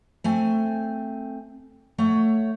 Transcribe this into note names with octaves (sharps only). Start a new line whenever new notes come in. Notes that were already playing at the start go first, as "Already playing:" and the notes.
A3 C4 G#5
A3 C#5 F#5